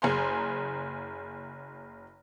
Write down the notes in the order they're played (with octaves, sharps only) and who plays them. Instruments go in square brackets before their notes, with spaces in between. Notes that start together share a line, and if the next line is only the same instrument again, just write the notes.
[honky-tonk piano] F#1 G#4 C5 G#5 A#5 C6